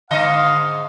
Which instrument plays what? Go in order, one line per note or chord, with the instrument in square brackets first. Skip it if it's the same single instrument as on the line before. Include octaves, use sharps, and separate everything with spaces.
[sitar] G#2 D3 D#5 [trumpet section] F5